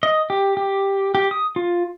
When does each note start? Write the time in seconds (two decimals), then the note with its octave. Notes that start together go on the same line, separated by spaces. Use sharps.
0.03 D#5
0.30 G4
0.57 G4
1.15 G4
1.31 D#6
1.56 F4